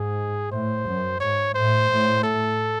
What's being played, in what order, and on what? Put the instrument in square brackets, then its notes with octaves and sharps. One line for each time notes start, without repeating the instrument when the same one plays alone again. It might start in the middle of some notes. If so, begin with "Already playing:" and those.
Already playing: [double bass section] G#2 [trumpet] G#4
[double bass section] A2 [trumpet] C5
[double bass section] F#2
[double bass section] G#2 [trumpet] C#5
[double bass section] A2 [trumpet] C5
[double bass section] A2
[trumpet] A4